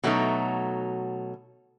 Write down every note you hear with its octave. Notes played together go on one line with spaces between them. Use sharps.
B2 F#3 A3 D#4